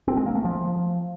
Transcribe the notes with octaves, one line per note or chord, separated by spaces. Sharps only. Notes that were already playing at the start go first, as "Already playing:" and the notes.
C4
G#3
A#3
A3
F3